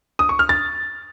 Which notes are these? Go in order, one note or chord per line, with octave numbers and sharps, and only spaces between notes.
D#6
C#6
F6
A6